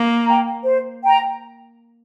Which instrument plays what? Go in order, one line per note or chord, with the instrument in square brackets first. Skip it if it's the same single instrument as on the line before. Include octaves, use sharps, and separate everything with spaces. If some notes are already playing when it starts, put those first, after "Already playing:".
Already playing: [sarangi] A#3
[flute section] G5 A#5
C5
G5 A#5